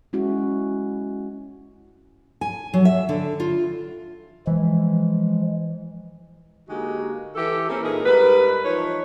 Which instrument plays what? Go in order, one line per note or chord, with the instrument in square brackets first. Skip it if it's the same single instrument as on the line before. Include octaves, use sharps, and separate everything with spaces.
[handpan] G#3 C#4 E4 F#4
[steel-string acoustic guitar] G#5
F#3
E5
D3
F4
[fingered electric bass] E3 [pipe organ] F3 G#3
[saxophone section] D3 G#3 A#3 D#4 F#4 G4
E3 G4 A4
A#3 C4 C#4 E4 A4
A#2 E3 D#4 G#4 A#4
G#2 G3 A#4 B4
E3 F3 D#4 B4 C#5